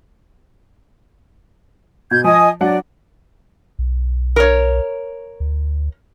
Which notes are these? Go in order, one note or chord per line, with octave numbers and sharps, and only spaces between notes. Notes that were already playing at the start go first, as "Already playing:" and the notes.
B2 G6 G#6
F3 D#5 G#5 D#6
F#3 D4 D5 F#5
B1
A#4 C#5
D2